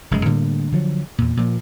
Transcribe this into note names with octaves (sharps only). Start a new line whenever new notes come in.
F1 F#2 C#3 G#3
A2 D3 G3 A#3
D3 F3 F#3
E2 A#2
A#2 F3 A#3